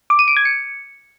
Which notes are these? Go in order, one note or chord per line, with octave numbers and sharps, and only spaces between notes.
D6
D#7
D7
G#6
C#7